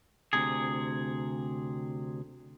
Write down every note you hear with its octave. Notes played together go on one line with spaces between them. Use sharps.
D2 C3 G#4